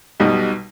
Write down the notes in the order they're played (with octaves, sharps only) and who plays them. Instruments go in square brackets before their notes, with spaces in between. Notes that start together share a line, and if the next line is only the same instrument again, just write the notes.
[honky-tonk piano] B1 B2 G3 B3 D#4